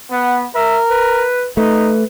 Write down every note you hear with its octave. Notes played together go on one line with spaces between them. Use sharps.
B3 F#5
A#4 E5
B4
A3 D#4 B4